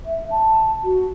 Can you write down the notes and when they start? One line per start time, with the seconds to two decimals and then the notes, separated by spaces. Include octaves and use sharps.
0.06 E5
0.31 A5
0.84 F#4